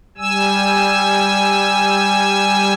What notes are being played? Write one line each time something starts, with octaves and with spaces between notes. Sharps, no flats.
G3 G#5 E6